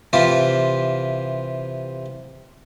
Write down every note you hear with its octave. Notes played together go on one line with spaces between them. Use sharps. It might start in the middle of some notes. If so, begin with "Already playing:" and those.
C3 E3 F4 G4